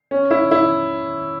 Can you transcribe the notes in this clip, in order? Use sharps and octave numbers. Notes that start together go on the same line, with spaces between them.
C#4
E4
E4